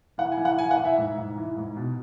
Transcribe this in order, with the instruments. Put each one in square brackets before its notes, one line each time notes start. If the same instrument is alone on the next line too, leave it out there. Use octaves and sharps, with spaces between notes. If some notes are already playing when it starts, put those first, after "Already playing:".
[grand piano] E3 F#5
G#5
E3
F#5
E3 G#5
F#5
E3
E5
G#2
G#2
E3
G#2
B2